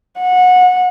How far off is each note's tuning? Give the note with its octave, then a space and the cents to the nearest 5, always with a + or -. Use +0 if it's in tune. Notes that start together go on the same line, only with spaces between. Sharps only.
F#5 -25